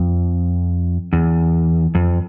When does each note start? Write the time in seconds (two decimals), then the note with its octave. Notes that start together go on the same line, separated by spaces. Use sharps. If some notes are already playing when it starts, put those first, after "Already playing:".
Already playing: F2
1.13 E2
1.95 F2